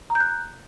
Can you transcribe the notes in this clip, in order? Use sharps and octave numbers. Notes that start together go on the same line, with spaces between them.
A#5
G6
F#6